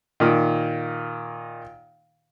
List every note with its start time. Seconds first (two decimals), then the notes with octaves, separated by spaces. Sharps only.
0.20 A#2 D#3